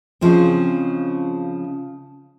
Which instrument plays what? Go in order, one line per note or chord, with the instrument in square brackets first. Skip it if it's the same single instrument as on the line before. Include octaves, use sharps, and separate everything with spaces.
[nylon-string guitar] C#3 F3 G#3 C4